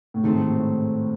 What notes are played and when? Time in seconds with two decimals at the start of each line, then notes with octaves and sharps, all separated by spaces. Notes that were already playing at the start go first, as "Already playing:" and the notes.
0.14 A2
0.23 G#2 C3 D#3 A3 C4
0.50 A2